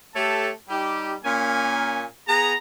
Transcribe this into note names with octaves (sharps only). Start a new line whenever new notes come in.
A3 G4 A4 C#5 A5
G3 D#4 G4
A#2 A#3 C#4 G#5
B3 G#4 A#5